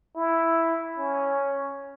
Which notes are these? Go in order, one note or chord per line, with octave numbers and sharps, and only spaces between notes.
E4
C#4